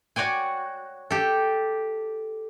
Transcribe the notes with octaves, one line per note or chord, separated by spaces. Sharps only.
F#4 C#5 D5 G5 G#5
G4 A4